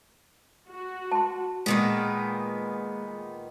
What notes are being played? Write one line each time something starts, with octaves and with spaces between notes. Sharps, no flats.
F#4
A5 C6
A#2 D#3 G#3 A#3 B3